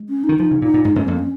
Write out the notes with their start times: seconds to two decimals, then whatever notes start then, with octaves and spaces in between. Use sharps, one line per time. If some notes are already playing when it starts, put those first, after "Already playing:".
Already playing: G#3
0.09 C#4
0.24 D#4
0.29 D#3
0.39 F3 D#4
0.51 C#3
0.62 A#2 D#4
0.74 A#2
0.85 G#2 D#4
0.96 G#2 C#4
1.08 F2 A#3
1.19 C#4